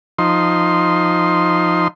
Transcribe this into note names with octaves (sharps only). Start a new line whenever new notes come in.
F3 D#4 C6